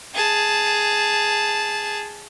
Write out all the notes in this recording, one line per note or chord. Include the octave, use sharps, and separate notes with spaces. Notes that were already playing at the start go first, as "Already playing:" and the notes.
G#4 A5